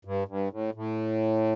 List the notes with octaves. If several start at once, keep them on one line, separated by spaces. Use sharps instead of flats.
G2
G2
A2
A2